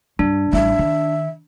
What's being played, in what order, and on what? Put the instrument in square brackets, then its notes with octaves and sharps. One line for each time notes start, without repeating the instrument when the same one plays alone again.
[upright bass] G2 [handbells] D4
[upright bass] A1 G3 [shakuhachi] E5
[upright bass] D#3